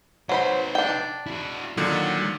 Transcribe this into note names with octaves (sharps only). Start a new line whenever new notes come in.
F#3 D#4 B4 C5 B5
D4 G5
E4 F#4
A#2 D3 D#3 F#3